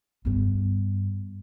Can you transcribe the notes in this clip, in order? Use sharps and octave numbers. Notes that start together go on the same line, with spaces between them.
G2 B3